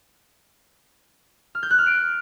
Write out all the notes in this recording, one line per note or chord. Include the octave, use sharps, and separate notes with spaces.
F6
G6
F#6
F6
D7